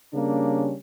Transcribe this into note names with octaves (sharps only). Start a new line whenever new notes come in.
C#3 G3 A#3 C#4 D4